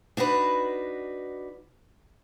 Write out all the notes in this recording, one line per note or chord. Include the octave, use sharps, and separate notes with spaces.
D4 D#4 F#4 B4